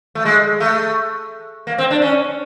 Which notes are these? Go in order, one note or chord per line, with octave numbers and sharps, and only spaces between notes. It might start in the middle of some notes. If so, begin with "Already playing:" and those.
A3
G#3
A3
A#3
C4
D4
C#4